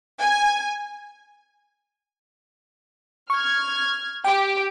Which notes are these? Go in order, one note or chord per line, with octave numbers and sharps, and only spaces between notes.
G#5
C#6 F6 G#6
G4 G5